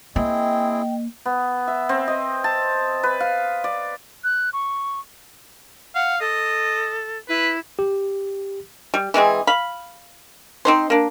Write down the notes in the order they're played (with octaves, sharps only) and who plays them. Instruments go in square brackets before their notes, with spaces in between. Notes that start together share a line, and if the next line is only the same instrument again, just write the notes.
[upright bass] A#3 [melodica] C4 E4 G#4 [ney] D#5 [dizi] G5
[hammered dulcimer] B3
E5
C4
D#5
A5
B4
F5
D5
[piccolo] F#6
C#6
[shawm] F5 [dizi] F#5
[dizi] A4 [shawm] D#5
[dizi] E4 [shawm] B4
[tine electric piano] G4
[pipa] G3
E3 G#3 C4 G#4
F5 B5
C4 D#4 C5
A#3 D4